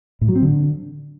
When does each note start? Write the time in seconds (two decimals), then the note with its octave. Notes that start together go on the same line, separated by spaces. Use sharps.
0.21 A2
0.29 F#3
0.36 C4
0.43 D3